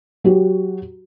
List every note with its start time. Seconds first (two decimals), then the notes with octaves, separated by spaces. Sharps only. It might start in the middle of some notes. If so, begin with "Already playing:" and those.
0.24 F#3 F#4 G4